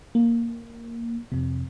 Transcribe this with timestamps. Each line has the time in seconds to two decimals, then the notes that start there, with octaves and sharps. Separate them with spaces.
0.15 A#3
1.32 F2 C3